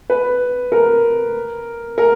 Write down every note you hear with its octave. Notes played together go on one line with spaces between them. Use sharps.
B4
A#4
A#4